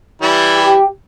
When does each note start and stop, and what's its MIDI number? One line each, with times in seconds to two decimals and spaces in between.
0.22 0.76 52
0.22 0.76 55
0.22 0.76 64
0.55 0.86 67